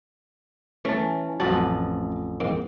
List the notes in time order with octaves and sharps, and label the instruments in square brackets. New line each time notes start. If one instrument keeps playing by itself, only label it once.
[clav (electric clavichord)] E3 A5 [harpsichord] A3 [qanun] C#4
[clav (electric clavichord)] A1 F2 A5 [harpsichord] F#3 F#4 [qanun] B4
[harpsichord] G#2 A#3 C4